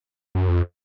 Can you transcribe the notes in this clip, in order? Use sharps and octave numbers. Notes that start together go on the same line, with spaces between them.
F#2
F2